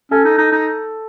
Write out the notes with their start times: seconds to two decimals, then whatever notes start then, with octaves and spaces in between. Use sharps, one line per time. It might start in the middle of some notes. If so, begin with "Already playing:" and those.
0.11 C#4 A4
0.25 D#4
0.38 D#4
0.52 D#4